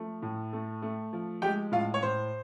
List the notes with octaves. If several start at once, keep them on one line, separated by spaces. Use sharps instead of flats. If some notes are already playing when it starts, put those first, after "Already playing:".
Already playing: F3 A3
A2
A3
A3
F3
G#3 G4 G5
A2 F4 F5
C#5
A2 C5